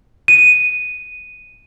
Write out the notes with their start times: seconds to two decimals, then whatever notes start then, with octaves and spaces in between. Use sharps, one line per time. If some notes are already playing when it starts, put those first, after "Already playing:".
0.28 D#7